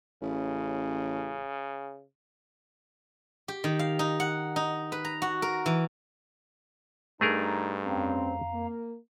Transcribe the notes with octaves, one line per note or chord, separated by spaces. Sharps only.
A1 C#3
G4
D#3
F5
D#4
F#5
D#4
B4
A#5
F#4
A#4
E3
G2 A3 D#4 G#4 A#4 A#5
F2 C4 C#4 F5 A#5
A#3